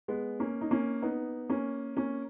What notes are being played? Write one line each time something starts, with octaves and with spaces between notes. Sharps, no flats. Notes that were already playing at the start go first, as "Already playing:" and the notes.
G#3 B3
A#3 C#4
D#4
A#3 C#4
B3 D#4
A#3 C#4
A#3 C#4